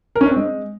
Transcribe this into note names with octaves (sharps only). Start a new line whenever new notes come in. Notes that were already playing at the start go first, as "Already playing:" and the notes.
A#4
C#4
D4
C4
G#3